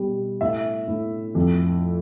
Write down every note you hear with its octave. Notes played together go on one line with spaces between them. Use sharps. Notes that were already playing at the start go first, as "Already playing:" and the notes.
Already playing: B2 G3
A2 E5
A2
F2